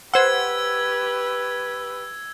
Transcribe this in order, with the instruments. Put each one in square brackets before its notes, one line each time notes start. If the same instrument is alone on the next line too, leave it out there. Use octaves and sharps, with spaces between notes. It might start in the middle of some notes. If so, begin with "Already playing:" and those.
[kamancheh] G4 B4 [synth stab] C5 F#5 [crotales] E6 G#6